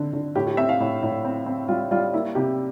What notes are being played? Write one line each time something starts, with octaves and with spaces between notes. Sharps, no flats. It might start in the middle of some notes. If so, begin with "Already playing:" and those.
Already playing: D3 C4
D3
A2 G4
G4
C4 E5
F5
A2
A2
C4
C4
G3 F4
G3 F4
A#3 E4
C3 G4